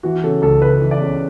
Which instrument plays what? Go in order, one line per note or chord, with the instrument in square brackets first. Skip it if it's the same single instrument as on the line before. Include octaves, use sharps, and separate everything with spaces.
[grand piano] E3 F#4
C#3 A4
C#2 A4
C#2 B4
E3
D5
C#3